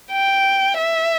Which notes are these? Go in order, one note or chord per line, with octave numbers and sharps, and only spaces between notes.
G5
E5